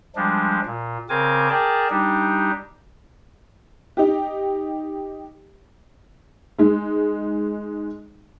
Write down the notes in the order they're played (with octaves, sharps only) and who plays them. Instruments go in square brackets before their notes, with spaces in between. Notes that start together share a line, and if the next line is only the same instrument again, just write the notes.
[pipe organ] F3 G3 G#3 D4
A#2
C#3 C4 A#4 G#5 D6
G#4 A#4 D5 G5 A5
G3 D4 D#4 G4
[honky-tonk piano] D#4 G4
G#3 D#4